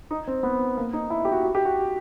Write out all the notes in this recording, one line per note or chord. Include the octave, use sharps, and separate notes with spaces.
D#4
C4
B3
A#3
D#4
E4
G4
F#4
F#4
G4
F#4